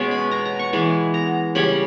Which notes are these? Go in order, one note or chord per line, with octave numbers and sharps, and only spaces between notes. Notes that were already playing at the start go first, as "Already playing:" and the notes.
Already playing: B2 G#3 C#4
B5
A#5
A#5
C#6
E3 G#3 B3
A#5
C#3 G3 C#4 B5